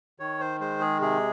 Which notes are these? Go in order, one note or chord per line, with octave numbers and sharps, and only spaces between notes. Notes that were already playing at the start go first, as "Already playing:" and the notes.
D#3 C#5
C5
G#3 C5
G#4
C3 G#4